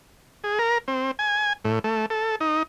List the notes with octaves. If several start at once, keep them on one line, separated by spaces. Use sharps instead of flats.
G#4
A#4
C4
G#5
A2
A3
A4
D#4